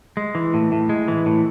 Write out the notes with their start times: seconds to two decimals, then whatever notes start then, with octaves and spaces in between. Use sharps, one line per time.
0.17 G#3
0.35 E3
0.54 A2
0.72 A2
0.89 G#3
1.08 E3
1.26 A2